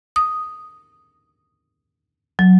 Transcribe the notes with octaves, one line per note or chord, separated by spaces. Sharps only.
D#6
F#3